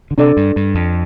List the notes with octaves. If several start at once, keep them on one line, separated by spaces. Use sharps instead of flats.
D3
C3 D4 A4 D5
G2
G2
F2